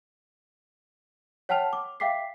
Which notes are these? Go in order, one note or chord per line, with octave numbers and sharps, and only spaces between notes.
C#5 F#5 G5 A5 F6 F7
D6
E5 F5 G5 D6 B6 C7